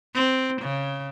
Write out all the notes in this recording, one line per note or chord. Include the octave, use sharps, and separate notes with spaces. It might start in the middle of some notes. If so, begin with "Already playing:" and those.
C4
C#3